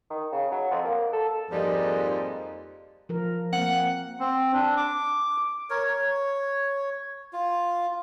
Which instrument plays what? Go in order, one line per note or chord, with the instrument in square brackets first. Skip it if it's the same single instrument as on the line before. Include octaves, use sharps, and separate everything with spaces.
[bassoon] D#3
C#3
F#3
F2
A#3
A4
[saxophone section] F2 G#2 F3 G3 A#3 D#4
[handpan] F3 A#4
[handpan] A#3 C4 [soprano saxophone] F#5
[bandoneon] C4
D4
D6
[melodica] A#4 C#5
C#5
F4